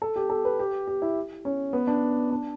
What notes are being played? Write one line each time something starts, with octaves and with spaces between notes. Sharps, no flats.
A4
G4
A4
B4
G4
G4
E4
C#4
B3
D4
D4